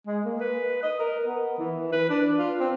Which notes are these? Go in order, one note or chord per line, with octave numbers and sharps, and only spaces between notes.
G#3
A#3
B4
D#5
A#4
B3
E3
B4
D4
F4
C4